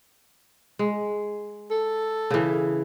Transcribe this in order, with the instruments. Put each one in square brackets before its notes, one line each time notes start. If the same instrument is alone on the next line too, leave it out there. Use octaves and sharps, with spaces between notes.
[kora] G#3
[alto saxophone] A4
[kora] C#3 E3